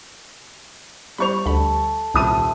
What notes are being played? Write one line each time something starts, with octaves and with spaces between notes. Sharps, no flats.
G3 C5 B5 C#6 F7
D2 A4 B5
D#1 C2 C5 E5 A5 D#6 D#7